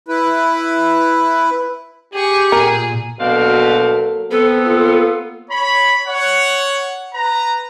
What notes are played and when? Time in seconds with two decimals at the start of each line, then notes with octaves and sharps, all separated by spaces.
0.08 E4 B4
2.14 G4 G#4 C#6
2.52 A#2 G#4 A#4
3.20 B2 F#3 A#3 C4 D4 A4 F5
4.31 B3 C4 A4
4.66 A#3 F4
5.50 C#5 B5
6.07 C#5 F#5
7.14 B4 A#5